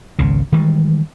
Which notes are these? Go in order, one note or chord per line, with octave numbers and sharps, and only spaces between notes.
G#1 C#2 C#3
D#3 E3 G3 G#3